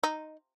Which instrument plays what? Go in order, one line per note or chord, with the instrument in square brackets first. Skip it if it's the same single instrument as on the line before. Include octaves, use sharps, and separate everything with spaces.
[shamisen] D#4